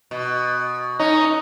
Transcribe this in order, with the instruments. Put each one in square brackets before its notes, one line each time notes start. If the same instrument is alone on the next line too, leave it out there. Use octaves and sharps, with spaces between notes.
[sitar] B2
[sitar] C#4 [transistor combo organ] D#4